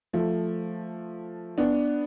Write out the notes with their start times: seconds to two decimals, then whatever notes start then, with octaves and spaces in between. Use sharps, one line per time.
0.13 F3 A3
1.58 B3 D4